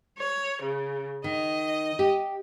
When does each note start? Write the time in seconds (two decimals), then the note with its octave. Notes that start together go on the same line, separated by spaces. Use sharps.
0.17 C#5
0.62 C#3
1.24 D#3 D#5
1.99 G4